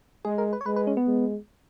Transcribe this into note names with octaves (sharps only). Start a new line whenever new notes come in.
G#3 G#4
A#4
B4
C#5
G#3 B4
B4
C#4
B3
G#3